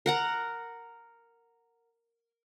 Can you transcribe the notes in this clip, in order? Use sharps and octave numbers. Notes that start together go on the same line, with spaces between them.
A#4 F#5 A#5